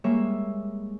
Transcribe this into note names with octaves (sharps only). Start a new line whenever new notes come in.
G3 G#3 A#3 C#5 E5